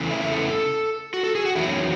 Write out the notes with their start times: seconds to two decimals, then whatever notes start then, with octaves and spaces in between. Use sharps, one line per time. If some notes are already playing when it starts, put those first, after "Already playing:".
Already playing: E2 C#3 E3 A3
0.11 E5
0.21 E5
0.31 A4
1.14 F#4
1.23 A4
1.35 G#4
1.45 F#4
1.55 E2 D#3 F#3 A3 E4
1.69 C#4